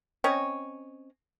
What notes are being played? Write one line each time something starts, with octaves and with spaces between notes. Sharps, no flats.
C4 C#4 C#5 D#5